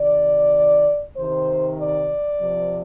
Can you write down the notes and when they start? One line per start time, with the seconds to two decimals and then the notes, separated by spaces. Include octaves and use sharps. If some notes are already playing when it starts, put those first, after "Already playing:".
Already playing: C3 D#3 D5
1.17 C3 D#3 C5
1.79 D5
2.41 C3 F3